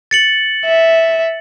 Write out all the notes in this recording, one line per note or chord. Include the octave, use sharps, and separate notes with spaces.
A6 C#7 F#7
E5